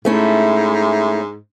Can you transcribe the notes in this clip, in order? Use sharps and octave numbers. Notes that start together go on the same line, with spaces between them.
G#2 A3 C#4 E4